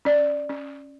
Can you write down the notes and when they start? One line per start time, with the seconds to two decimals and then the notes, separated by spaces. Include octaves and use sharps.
0.05 C#4 D5
0.49 C#4